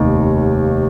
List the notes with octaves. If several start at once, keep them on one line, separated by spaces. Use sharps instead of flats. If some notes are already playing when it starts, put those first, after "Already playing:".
Already playing: F1 D#2 D#3 A#3